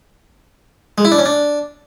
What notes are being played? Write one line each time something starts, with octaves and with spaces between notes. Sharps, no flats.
G#3
E4
D4
C#4
D4